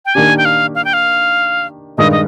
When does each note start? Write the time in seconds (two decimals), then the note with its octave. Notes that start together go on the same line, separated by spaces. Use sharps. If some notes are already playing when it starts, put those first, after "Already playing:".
0.05 G5
0.14 D#3 A#3 D4 G4 G#5
0.38 G5
0.45 F5
0.75 F5
0.85 G5
0.93 F5
1.98 G2 D#3 G#3 D#5
2.12 D#5